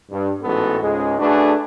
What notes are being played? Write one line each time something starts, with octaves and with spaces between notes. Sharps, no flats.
G2
A1 G#2 B3 F#4 A4
C#2 G#2 G#3
A3 D4 F#4 G#4 A4 B4